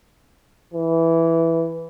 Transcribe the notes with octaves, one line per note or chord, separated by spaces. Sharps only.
E3